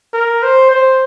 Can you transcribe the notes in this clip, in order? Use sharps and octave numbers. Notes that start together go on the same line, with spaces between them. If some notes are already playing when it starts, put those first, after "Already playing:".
A#4
C5
C5